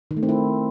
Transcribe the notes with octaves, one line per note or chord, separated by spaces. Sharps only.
D#3
A3
C4
E4